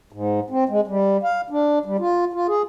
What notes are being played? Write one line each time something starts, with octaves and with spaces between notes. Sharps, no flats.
G#2
C4
G#3
G3
F5
D4
G3
F4
F4
G#4